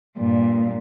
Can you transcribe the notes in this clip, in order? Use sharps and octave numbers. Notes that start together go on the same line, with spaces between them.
G2 A#2